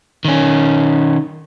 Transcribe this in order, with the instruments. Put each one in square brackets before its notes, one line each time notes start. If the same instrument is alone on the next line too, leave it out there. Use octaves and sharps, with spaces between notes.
[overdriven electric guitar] D#3 C#4